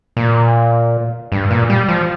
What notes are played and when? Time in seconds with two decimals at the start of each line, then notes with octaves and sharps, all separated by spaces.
0.17 A#2
1.32 G2
1.51 A#2
1.70 G3
1.89 F3